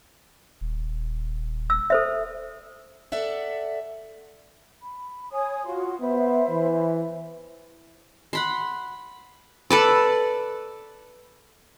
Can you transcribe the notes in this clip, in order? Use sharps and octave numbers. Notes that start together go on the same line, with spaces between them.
D#1
E6
A4 C5 E5
A4 D5 E5 F#5
B5
C#5 G#5 D#6
F4 F#4 C6
B3 C5 E5 B5
E3
F#5 B5 C6
A4 B4 D5